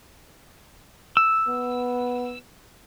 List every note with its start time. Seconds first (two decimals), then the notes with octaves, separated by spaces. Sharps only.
1.17 E6
1.48 B3